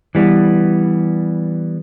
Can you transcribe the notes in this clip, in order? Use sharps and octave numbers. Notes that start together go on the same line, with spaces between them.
E3 G3 B3